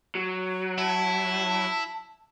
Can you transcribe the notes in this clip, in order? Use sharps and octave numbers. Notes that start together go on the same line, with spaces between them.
F#3
E4 A5